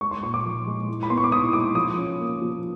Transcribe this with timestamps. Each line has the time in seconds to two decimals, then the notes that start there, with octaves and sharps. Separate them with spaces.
0.01 G#3 C#6
0.11 C6
0.22 A#2 C#6
0.34 D6
0.45 F3
0.67 G#3
0.88 E4
1.03 B5
1.10 B3 C6
1.17 C#6
1.24 D6
1.32 E4 D#6
1.53 G#3 D6
1.75 F3 D#6
1.97 C#4
2.19 A#3
2.41 F3